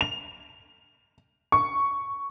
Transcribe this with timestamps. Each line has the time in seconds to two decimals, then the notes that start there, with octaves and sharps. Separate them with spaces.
0.01 F7
1.52 C#6